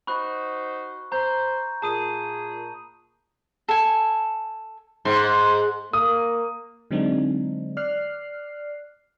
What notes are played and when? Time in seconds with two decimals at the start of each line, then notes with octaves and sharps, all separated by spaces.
0.07 D#4 F#4 C5 B5 C#6 F#6
1.12 C5 A#5 G6
1.82 A#2 G#4 A5 D#6 D#7
3.68 A4 G#5
5.05 G#2 C6
5.93 A#3 D#6
6.91 D3 F#3 G#3 C4 D4 D#4
7.77 D5 F6 F#6 C7